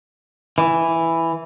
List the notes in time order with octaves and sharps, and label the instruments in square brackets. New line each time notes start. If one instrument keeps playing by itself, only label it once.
[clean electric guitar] E3